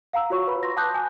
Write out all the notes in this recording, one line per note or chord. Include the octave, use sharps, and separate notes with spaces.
F5 F#5 A#5 E6
F4 F#4 C#5 C#6
B4 B5
C6 A#6
F#5 A5 D6 D#6 F#6 G6
G#5